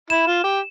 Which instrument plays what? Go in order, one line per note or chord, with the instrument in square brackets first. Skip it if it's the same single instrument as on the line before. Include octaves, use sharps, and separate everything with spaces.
[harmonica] E4 [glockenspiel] E7
[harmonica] F4
G4